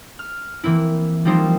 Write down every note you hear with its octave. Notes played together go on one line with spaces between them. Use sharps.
F6
E3 A#3 C4 E4
F3 G3 A#3 C4 D#4 C5